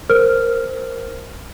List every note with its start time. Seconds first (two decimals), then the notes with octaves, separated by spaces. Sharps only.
0.10 A#4 C5 F6